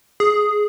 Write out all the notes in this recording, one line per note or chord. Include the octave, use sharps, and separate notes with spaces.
G#4